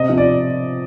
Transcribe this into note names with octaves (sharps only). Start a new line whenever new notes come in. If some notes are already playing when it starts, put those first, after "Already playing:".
Already playing: C3 D#5
F3
D5